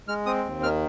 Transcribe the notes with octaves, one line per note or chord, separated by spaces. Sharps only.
G#3 F6
C4 D#6
D#2
D#3 F6